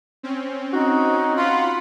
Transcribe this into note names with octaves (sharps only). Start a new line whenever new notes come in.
C4 C#4
D#4 F#4
F4 F#5 B5 C6